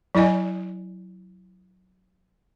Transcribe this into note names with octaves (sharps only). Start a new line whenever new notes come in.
F#3 E4 D5 D#5 G#5